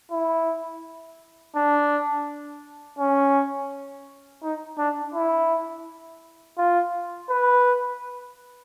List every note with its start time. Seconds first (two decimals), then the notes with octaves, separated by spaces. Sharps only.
0.11 E4
1.56 D4
2.99 C#4
4.43 D#4
4.78 D4
5.14 E4
6.58 F4
7.30 B4